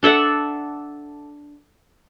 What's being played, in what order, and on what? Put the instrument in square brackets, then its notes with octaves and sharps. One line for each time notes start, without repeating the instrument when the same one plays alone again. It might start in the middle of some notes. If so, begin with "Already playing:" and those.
[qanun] D4 A4 E5 F#5